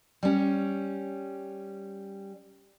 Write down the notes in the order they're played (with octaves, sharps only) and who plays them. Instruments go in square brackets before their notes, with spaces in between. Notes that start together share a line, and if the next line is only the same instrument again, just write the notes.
[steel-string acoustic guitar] G3 C#4